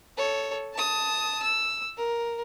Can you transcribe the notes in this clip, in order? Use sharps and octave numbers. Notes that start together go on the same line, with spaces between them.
A4 C#5
A5 D#6
E6
A#4